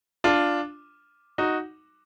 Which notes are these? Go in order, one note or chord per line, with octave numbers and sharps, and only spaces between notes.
D4 F4
D#4 F#4